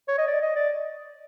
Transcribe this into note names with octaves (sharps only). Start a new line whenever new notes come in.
C#5
D#5
D5
D#5
D5